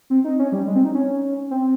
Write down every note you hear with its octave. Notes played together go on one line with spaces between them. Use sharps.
C4
D#4
C#4
G3
G#3
C4
D#4
C#4
C4